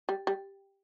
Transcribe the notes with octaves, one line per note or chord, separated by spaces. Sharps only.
G3
G3